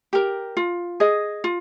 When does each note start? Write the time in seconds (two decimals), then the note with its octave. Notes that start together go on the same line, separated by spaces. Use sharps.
0.13 G4 A#4
0.57 F4
1.00 G#4 D#5
1.44 F4